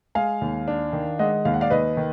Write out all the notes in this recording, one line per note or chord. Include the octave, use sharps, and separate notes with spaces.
G#3 F5 G#5
D#2
D4
D#3
G#3 D#5 F#5
D#2 F5
F#5
D5 F5
D#2 B4 D#5
D#3